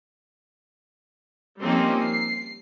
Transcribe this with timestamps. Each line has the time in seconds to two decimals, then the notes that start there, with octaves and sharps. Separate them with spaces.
1.60 F3 G3 A#3 C4 C#4 D#4
2.01 C7